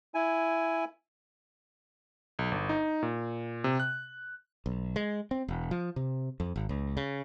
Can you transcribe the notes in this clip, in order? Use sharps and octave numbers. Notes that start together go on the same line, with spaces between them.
E4 G#5
B1
G1
D#4
A#2
C3
F#6
B1
G#3
C4
E1
F3
C3
F2
G#1
C#2
C#3